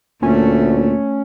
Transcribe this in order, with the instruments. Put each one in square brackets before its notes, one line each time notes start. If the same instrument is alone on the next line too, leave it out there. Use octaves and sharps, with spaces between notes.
[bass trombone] D2 [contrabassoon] A#2 [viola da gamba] A3 [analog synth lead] C#4